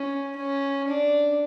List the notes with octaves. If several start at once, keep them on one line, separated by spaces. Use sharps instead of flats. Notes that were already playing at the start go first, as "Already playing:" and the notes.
Already playing: C#4
C#4
D4